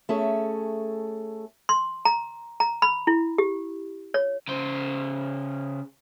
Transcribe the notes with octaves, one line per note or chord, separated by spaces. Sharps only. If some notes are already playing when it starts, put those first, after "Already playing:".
A3 C#4 G#4 A4
C6
A#5
A#5
B5
E4
G4
C#5
C#3 C5